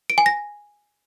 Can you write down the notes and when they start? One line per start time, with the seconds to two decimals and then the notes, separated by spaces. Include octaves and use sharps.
0.10 D7
0.18 G#5
0.26 A#6